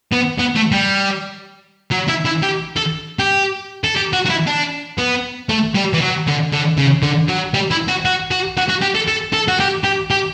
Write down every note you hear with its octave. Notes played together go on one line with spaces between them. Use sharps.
B3
B3
A3
G3
F#3
E4
E4
G4
A4
G4
A4
G4
F#4
F#4
E4
D4
B3
A3
G3
E3
F#3
D3
D3
C#3
D3
F#3
G3
E4
F#4
F#4
F#4
F#4
F#4
G4
A4
A4
A4
F#4
G4
G4
G4